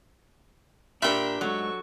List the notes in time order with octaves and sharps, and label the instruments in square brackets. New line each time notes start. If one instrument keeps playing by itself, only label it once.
[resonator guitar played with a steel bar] A#2 G4 [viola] D4 [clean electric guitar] A#4 B5 [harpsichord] E5 G5
[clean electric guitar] C2 G#2 [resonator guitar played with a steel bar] F#3 [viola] A4 C#6